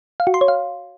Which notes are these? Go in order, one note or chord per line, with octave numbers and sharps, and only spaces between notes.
F5
F#4
C6
C#5
F5